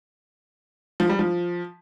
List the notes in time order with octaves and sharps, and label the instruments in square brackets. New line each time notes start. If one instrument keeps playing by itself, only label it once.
[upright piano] F3
G3
F3